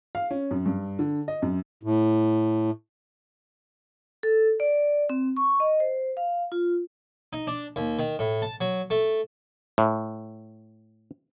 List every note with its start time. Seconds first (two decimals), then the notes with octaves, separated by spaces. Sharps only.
0.15 F5
0.31 C#4
0.51 F#2
0.66 G2
0.99 D3
1.28 D#5
1.42 F#2
1.83 A2
4.23 A4
4.60 D5
5.10 C4
5.37 C#6
5.60 D#5
5.80 C5
6.17 F5
6.52 F4
7.33 D#4
7.47 D4
7.76 D#2
7.99 D#3
8.19 A2
8.42 A5
8.61 F#3
8.90 A3
9.78 A2